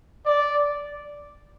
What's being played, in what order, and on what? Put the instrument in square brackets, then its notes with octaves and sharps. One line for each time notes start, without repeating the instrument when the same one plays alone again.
[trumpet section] D5